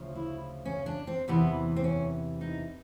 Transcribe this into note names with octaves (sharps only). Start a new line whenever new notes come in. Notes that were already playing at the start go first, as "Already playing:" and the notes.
Already playing: D2 C#3 F3
E4
C#4
D4
C4
E2 C3 E3 B3
C4
C#4
D#4